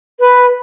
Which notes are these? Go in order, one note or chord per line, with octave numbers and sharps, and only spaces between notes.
B4